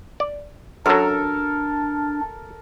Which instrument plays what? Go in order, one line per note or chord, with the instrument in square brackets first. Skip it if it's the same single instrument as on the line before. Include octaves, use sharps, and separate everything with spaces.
[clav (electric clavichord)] D5
[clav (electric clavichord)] F#2 F#3 [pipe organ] D4 [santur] A4 [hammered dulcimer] A#4